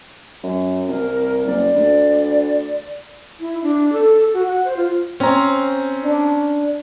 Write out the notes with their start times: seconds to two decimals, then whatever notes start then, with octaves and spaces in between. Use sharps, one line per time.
0.44 F#2
0.88 C2 A#4
1.46 F#1 D5
1.75 D2
3.40 E4
3.63 D4
3.93 A4
4.34 F#4
4.48 F#5
4.65 C5
4.77 F4
5.20 C4 C#4 A#5
6.03 D4